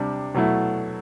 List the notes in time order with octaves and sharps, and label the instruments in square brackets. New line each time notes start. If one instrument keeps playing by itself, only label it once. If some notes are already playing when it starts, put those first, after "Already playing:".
Already playing: [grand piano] C3 G3 D4
B2 F#3 A3 E4